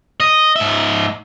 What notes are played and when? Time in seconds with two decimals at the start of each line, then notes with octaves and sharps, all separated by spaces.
0.20 D#5
0.56 G#2 E5